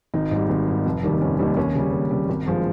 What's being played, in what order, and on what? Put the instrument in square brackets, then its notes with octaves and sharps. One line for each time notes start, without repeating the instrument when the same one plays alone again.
[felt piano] G#1 D#4
G#2 G3
G#1
G#2 G3
F1
D#2 D#3 G3
F1 C#4
D#2 D#3 G3
D#2 C#4
C#3 G3
D#2
C#3 G3
G#1
G2 F3 G#3